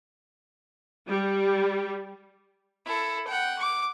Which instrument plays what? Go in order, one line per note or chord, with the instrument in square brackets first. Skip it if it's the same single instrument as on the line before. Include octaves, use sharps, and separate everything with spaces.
[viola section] G3
[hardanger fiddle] E4 A4
F#5 G5
D6